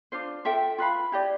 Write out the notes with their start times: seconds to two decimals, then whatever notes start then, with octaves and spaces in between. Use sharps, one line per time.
0.12 D4 F4 C5
0.45 F4 A4 E5 G5
0.78 F4 B4 F5 B5
1.12 E4 G4 D5